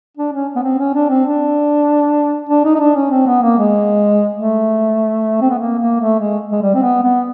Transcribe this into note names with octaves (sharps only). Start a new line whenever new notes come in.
D4
C#4
B3
C4
C#4
D4
C4
D4
D4
D#4
D#4
D4
C#4
C4
B3
A#3
G#3
A3
C4
B3
A#3
A#3
A3
G#3
G#3
G3
C4
B3
B3